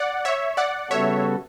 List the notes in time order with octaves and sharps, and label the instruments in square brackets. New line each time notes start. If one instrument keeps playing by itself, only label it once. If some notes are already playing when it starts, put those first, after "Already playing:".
Already playing: [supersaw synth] D5 F#5
C#5 E5
D5 F#5
[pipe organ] C#3 G3 B3 F#4 A4 [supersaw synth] C#5 E5